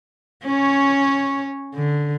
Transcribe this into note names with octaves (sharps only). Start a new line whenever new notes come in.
C#4 C#5
D3